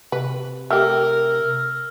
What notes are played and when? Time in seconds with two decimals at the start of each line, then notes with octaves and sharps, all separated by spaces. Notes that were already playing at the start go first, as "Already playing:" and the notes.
0.12 C3 B4
0.70 A3 G4 A#4 E6 F6